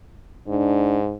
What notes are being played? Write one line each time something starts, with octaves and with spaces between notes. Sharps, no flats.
G#2 D4